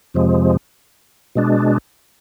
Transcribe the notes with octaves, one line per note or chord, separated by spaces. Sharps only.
F2 C3 F3 G#3
B2 G#3 D4